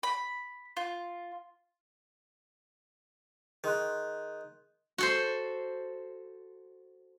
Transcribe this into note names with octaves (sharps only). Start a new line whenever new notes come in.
B5
F4
D#3 G#4 C6 F#6
F#4 A4 C5